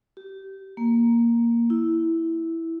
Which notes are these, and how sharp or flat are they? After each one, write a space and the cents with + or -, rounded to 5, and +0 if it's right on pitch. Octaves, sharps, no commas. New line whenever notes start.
G4 -20
A#3 +5
E4 -5